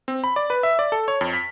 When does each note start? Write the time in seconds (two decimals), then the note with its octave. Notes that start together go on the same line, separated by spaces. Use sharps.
0.08 C4
0.24 B5
0.36 D5
0.50 B4
0.63 E5
0.79 D5
0.92 A4
1.08 C#5
1.21 F2
1.33 B6